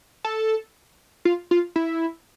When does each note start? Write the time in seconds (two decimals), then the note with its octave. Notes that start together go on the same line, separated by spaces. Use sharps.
0.25 A4
1.25 F4
1.51 F4
1.76 E4